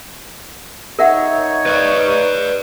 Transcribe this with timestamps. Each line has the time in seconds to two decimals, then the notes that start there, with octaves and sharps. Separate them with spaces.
0.99 D#4 A#4 C#5 E5 F#5
1.66 B4 D5